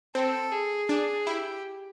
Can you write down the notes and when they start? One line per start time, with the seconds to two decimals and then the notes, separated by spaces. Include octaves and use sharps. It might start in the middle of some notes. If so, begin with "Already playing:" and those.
0.15 C4 A4
0.52 G#4
0.89 D4 G#4
1.27 E4 G4